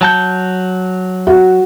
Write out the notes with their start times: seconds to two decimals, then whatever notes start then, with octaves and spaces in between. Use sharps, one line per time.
0.01 F#3 A5 G6
1.27 F#4